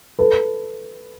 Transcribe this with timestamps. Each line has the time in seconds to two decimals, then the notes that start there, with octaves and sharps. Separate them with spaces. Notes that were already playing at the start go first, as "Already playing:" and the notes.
0.19 A4 B4